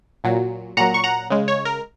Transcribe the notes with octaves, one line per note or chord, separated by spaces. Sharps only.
A#2 F#3
A#2 F#3 F#5 A#5
C#6
F#5 A#5
C#3 G#3
C#5
A#4